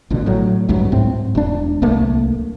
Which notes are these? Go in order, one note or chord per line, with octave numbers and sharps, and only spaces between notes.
A1 B2 D3
A2 F#3
G#1 C#2 G2 F#3
G#2 C4
E1 D4
D1 C2 A3 A#3